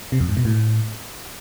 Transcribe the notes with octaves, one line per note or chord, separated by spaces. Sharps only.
C3
F2
G#2
B2
A2